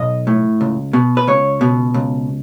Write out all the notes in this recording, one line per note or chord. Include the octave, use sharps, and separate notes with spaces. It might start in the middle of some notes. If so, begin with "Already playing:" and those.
Already playing: B1 D#5
A2
C#2
B2
B4
C#2 C#5
B2
C#2